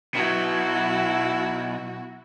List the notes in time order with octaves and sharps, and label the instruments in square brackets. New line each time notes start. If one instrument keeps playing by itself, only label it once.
[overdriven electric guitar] B2 F#3 [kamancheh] E4 F#4